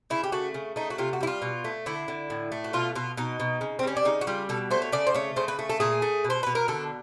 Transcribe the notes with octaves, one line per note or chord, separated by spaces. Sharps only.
C#3 E4
G4
A3 F#4
C#3
A3 D#4
F#4
C3 F4
F#4
G3 E4
F4
B2
A3
D3 E4
D3
A2
A3
F#4
B2 F4
B2 F4
B2 D#4
B2
C#3
C4
G3 C#4
D4
C#3 D#4
F#4
G3 F4
B2 A4
A3 C5
C#5
C#3 D5
C5
A3 C#5
C#3 C5
B4
A3
A4
A#2 G#4
A3
B2
C5
B2 B4
A#4
D3 A4